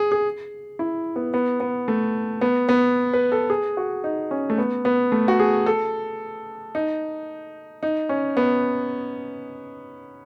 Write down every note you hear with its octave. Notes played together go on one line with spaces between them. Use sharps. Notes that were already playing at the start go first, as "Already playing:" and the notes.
Already playing: G#4
G#4
E4
B3
B3
B3
A3
B3
B3
B4
A4
G#4
F#4
D#4
C#4
A3
B3
B3
A3
F#4
G#4
A4
D#4
D#4
C#4
B3